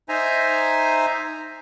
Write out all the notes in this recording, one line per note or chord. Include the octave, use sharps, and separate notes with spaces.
D#4 C5 E5 G#5 A#5